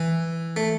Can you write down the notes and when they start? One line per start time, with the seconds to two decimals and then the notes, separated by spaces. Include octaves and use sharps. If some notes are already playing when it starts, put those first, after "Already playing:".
Already playing: E3
0.56 A3